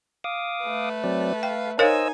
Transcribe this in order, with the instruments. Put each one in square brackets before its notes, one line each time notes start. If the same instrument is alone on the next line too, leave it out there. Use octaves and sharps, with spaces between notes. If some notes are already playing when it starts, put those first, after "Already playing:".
[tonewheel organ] F5 D6 D#6
[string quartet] A3 B4
[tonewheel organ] F#3 C4 D5
[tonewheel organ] F5 [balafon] G5
[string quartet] D#4 G#5 [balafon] A#4 C#5 F5 [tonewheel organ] C5 D#5 E6